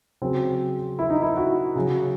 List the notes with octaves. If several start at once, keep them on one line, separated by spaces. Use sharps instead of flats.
C#3 F#3 C4
E4
D#4
E4
F#4
C#3 F#3